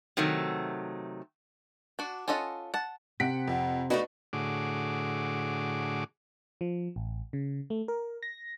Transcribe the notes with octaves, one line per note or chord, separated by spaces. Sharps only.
C3 D#3 F#3 A3
D4 F#4
C#4 F4 A4 D#5 F#5
F#5 A5
C3 F#5 B6 D7
F2 F#5
A3 D4 D#4 F#4 B4 D#5
A2 D3 F#4 G#4 D6
F3
A1
C#3
A3
A#4
A#6